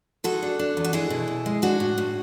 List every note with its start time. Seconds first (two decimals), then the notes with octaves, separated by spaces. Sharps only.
0.24 G#3 F#4 A4
0.42 D4
0.59 D4
0.77 E2
0.84 F#4
0.93 G#3 E4 G#4
1.10 B2
1.28 B2
1.46 G#3
1.62 D4 F#4
1.80 A2
1.98 A2